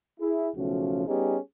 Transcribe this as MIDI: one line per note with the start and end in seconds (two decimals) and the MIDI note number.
0.20 0.49 64
0.20 0.49 68
0.56 1.05 35
0.56 1.05 49
0.56 1.05 53
0.56 1.05 57
0.56 1.05 61
0.56 1.05 66
1.07 1.38 55
1.07 1.38 59
1.07 1.38 61
1.07 1.38 63
1.07 1.38 67
1.07 1.38 68